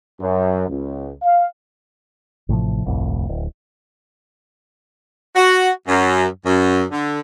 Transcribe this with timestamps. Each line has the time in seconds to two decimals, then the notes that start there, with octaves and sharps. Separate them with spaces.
0.21 F#2
0.68 C#2
1.22 F5
2.49 A1 A2 C3 F3
2.85 G1 C2 F2 A2
3.29 D1
5.36 F#4
5.87 F#2
6.44 F#2
6.91 D3